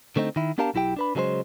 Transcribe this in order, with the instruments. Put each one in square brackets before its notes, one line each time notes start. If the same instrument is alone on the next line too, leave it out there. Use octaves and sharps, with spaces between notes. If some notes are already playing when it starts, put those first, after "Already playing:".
[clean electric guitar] D3 A3 C4 D#4
D#3 E4
B3 D4 G4 A#4 F5 A5
B1 F#3 E4 G4 G5
D4 B4 B5
C#3 F#3 G#3 G#4 C5